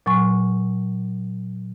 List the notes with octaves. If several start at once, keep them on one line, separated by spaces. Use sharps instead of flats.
A#2 F#3 G#5 C#6